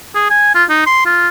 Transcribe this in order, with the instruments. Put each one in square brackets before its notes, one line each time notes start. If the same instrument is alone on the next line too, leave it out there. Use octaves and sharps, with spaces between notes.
[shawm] G#4
G#5
F4
D#4
C6
F4